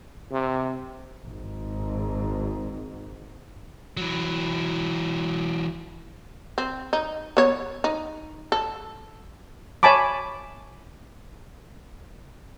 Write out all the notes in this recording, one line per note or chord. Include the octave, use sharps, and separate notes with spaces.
C3
G#1 G#2
E3 F#3
C4
D#4
B3 C#5
D#4
A4
C#5 E5 G#5 A5 B5 D6